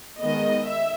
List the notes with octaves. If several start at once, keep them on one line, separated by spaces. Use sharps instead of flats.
D#3 G#3 B3 D#5
E5